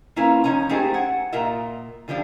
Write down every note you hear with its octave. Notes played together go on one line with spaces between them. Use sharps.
A#3 C#4 E4 F4 A#4 B4
F3 C#4 D#4 A#5
A3 A#3 D#4 G4 G#4 C5
F#5 G#5
A#2 F4 A#4 D#5 E5
D3 F3 G3 D4